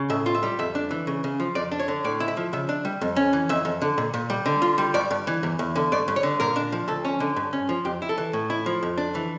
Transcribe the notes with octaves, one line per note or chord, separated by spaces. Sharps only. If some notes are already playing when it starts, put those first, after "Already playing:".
Already playing: C#3
A2 E5
F4
E5
G3
F2 E5
D4
E3
C#3
C#3
F3
F2 D5
D4
C#5
D3
A2 D5
E4
E5
F3
C#3 E5
D4
G3
F2
C#4
E3
F2 E5
F2
D3
A#2
A#2
G3
D3
F4
G3
G2 D5
G2
E3
E2
E2
D3
G2 D5
G2
C#5
D3
A#2 A#4
D4
F3
D2 A4
C#4
D3
G2
C#4
F3
F2 G4
E4
A4
E3
A2
E4
F3
F2
D4
E3